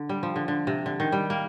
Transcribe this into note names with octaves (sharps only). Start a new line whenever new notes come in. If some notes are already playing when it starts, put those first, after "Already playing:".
Already playing: D3
G3
F3
D3
D3
C3
D3
D#3
G3
A#3